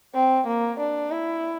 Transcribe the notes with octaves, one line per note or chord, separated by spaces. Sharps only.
C4
A#3
D4
E4